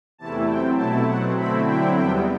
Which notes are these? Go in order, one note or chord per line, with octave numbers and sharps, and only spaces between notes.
E2 C3 E3 A3 E4 A5
C3 F#3 C4 G5
B2 A3 E4 A5
B2 F#3 C4 F#5
D3 A3 C4 E4 B5
D3 F#3 C4 E4 G5
E2 C3 G3 B3 G5